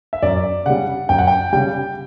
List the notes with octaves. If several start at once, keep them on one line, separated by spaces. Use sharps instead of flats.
E5
F#2 D5
C#3 G3 F#5
F#2 G5
F#5
G5
C#3 G3 G5